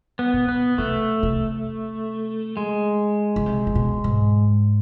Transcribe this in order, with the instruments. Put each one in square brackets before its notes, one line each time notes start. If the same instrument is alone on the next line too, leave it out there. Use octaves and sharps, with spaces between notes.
[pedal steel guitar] B3
[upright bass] B2
[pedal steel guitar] B3
[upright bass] C3 [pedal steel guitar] A3
[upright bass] C3
[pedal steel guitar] G#3
[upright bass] C#3
C3
C3
B2
G#2